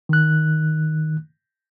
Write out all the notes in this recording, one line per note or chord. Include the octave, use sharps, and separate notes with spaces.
D#3 F#6